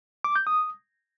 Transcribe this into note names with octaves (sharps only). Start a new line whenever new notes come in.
D6
G6
D#6